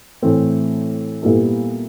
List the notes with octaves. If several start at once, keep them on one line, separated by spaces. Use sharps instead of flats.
A2 E3 A3 C4
A#2 G3 B3 E4 A4